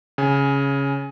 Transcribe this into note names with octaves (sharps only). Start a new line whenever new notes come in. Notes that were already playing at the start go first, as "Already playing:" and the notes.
C#3 G#5